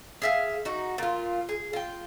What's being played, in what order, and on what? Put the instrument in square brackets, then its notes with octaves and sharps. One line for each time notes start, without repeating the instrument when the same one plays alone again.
[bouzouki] G#4 E5 F5
D#4 F#4
A#2 F4
G#4
F4 G5